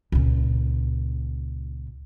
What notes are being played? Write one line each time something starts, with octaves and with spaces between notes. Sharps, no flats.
C#2 A#2